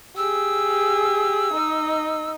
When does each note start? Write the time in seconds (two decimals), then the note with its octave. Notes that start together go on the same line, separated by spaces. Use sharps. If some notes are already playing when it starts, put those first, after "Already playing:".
0.17 G4 G#4 E6
1.54 D#4 D#5